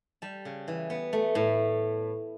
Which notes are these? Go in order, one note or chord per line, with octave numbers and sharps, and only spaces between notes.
G3 A5
C#3
E3
B3
A3
A2